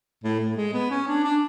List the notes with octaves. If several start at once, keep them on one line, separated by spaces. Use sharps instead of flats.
A2
A2
G#3
B3
C#4
D4
D4